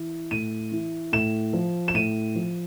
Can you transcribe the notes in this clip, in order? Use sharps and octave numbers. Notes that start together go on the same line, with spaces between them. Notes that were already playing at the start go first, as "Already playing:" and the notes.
Already playing: E3
A2 D#7
E3
A2 E7
F3
E7
A2 D#7
F3